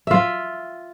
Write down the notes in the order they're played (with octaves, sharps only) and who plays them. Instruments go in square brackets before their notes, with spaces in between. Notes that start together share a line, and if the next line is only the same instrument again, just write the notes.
[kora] F4 E5